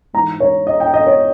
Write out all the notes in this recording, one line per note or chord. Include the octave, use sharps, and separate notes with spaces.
G#2 E3 A#5
C#5
D#5
G5
D#5
C#5